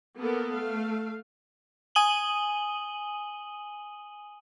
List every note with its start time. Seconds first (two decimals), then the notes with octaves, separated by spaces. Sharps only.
0.17 A#3 B3 A4 A#4
0.54 A3 F5
1.95 G#5 D#6 D#7 F#7 G7